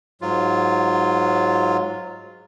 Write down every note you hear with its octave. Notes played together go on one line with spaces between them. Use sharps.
G#2 F#3 F4